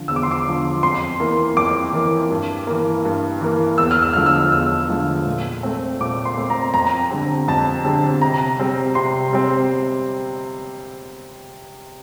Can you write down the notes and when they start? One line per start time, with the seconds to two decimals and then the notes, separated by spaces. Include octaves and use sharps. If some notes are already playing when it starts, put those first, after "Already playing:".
Already playing: D3 F3
0.08 E2 E6
0.16 D6
0.23 C6
0.31 D6
0.46 D3 F3
0.83 F2 C6
1.20 E3 A#3
1.57 F2 D6
1.93 E3 A#3
2.30 G2
2.67 E3 A#3
3.05 G2
3.41 E3 A#3
3.78 E2 E6
3.91 F6
4.02 E6
4.13 D3 F3 A3 F6
4.26 E6
4.52 E2 E6
4.89 D3 F3 A3
5.26 A#2
5.63 A3 C4
6.01 A#2 D6
6.25 C6
6.37 A3 C4
6.50 A#5
6.74 F2 A#5
7.11 D3 G3 C4
7.48 F2 A5
7.85 D3 G3 C4
8.22 C3 A#5
8.60 G3 C4
8.95 C3 C6
9.33 G3 C4